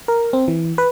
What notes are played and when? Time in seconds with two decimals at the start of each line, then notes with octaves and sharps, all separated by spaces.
0.08 A#4
0.33 C4
0.48 E3
0.78 B4